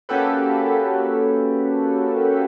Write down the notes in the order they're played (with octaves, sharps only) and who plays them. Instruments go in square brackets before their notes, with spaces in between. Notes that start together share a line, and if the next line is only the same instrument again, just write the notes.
[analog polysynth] A#3 C#4 F#4 G4 A4 B4